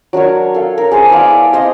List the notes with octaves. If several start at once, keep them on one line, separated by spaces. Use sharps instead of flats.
F#3 D4 A#4 C#5
A4 F5
A#4 C#5
G#4 C5 A5
B3 E4 D5 F5
C5 D#5 F5 C6